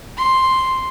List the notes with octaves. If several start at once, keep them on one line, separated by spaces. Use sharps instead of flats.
C6